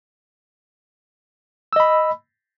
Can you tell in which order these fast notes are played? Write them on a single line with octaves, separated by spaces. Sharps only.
E6 D#5 B5